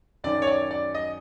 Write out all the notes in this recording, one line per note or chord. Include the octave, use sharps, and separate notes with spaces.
F#2 D#3 D5
C#5
D5
D5
D#5